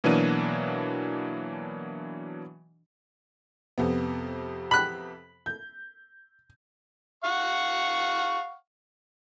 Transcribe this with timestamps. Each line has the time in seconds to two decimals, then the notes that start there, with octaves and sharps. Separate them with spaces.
0.04 B2 E3 F#3 A#3 D4 D#7
3.78 F2 C3 B3
4.71 B5 F#6
5.46 G6
7.24 F5 F#5 C#6